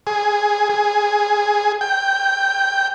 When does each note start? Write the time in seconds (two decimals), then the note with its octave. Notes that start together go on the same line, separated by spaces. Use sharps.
0.07 G#4
0.69 G#4
1.81 G5